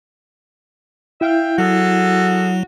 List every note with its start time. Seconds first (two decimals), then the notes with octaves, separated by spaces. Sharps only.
1.21 E4 E5 F5 G5
1.58 F#3 F#4 G#4 A4